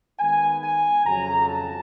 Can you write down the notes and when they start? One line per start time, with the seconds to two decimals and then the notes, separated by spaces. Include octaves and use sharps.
0.20 D#3 G#3 B3 D#4 G#5
0.63 G#5
1.05 F2 C#3 F#3 A#5
1.48 A5